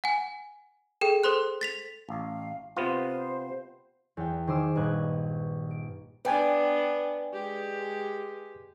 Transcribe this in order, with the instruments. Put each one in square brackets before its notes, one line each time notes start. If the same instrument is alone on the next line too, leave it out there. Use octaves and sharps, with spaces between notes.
[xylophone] F#5 G#5
G#4 A4 G5
A4 C5 C6 F#6
A6 B6 F7
[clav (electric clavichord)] A1 [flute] F5
[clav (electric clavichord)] C3 B3 F4 [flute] C5
[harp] E2 G5
D#3 G#4 C5 C6 D6 E6
A#1 G2 B4 D#5 F#6 G#6
D7
[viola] B3 D4 [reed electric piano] B4 G5 G#5 [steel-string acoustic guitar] D5
[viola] G#3 G4